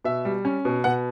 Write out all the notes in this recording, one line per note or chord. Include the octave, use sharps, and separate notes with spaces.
B2 E5
G3
C#4
B2
B2 F#5